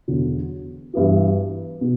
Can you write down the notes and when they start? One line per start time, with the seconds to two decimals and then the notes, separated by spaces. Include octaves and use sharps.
0.08 E2 D3 F#3
0.93 G2 E3 B3 F#4
1.81 B2